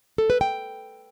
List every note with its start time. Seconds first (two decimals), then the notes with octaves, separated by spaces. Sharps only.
0.18 A4
0.30 B4
0.41 G5